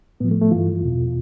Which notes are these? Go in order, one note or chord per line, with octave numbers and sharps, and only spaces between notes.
A2 F3 B3
A3
A3
G2 E3 F4
E2 B2